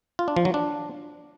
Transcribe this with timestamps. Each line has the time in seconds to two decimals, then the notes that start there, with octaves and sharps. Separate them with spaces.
0.19 F4
0.28 D4
0.36 F3
0.45 F#3
0.54 D4